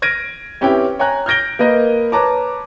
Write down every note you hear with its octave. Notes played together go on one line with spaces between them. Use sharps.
F6 G#6 A#6 D7 D#7
C4 C#4 E4 G4 B4 G5
C#5 G5 G#5 A#5 F#6
F6 G6 G#6 A#6 D7 G7
A#3 A#4 B4 D#5
B4 C#5 A5 A#5 D6